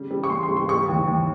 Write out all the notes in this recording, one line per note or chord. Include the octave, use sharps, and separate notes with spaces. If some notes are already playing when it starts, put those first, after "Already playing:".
Already playing: C#3 G3
G3
C#6
C#3 C6
C6
G3
C6
G3 C#6
D#2
D#2